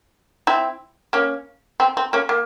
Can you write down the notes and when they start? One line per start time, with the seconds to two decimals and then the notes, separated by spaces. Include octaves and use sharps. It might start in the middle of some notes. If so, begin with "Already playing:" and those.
0.47 C4 E4
1.13 A#3 C#4
1.80 C4
1.97 C4
2.13 A#3 C#4
2.29 A#3